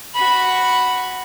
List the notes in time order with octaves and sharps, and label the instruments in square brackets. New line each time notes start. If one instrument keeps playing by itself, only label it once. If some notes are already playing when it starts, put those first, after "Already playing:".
[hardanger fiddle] F#4 B5